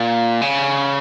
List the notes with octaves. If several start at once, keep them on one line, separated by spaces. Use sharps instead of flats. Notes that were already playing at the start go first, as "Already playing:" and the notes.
Already playing: A#2
C#3